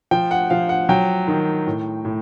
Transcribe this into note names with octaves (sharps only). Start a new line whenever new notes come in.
F3 G5
F#5
F3 F5
F#5
F#3 G5
D#3
A2
A2